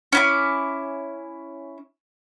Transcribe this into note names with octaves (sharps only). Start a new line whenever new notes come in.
C#4 E4 D6